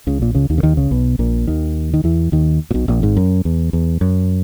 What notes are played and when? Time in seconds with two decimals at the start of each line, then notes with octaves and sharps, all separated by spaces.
0.07 C#2 C#3
0.21 A#1 A#2
0.35 C#2 C#3
0.50 D#2 D#3
0.58 C#3
0.63 D#2 D#3
0.77 C#2 C#3
0.91 B1 B2
1.19 A#1 A#2
1.47 D#2 D#3
1.94 D#3
2.04 E2 E3
2.32 D#2 D#3
2.71 A#2
2.74 B1 B2
2.88 A#1 A#2
3.02 G#1 G#2
3.17 F#2
3.45 E2
3.73 E2
4.01 F#2